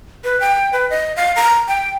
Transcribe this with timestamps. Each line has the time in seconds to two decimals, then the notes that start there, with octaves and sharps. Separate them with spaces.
0.24 B4
0.40 G5
0.73 B4
0.90 D#5
1.16 F5
1.36 A#5
1.68 G5